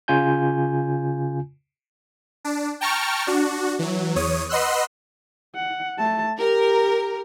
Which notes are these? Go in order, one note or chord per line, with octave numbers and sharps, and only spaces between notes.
C#3 F4 G#5 G6
D4
G5 A5 A#5 C#6 F6
D4 F#4
E3 F#3
E2 C#5 D#6
B4 D#5 F#5 C6 E6 F#6
F#5
A3 A5
G4 A#4